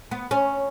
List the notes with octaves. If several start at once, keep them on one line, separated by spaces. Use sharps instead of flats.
B3
C#4